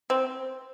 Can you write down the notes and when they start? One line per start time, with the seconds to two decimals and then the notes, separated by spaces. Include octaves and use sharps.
0.10 C4